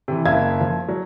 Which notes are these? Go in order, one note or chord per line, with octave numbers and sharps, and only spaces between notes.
C3 E3
F#1 E5 F5 G#6
F3
F#3